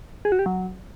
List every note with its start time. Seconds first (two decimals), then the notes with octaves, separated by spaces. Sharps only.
0.25 G#4
0.32 F#4
0.39 G4
0.46 F#3